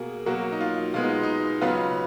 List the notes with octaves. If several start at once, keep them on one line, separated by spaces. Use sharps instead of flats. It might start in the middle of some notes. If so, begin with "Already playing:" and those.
Already playing: B2 A#3 G#4
B2 F#3 A#3 F#4
D#4
F4
B2 G#3 B3 F4
D#4
D#4
C#3 F#3 B3 F4